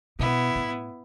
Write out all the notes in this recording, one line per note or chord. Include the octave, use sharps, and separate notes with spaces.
B2 B3 E4
A2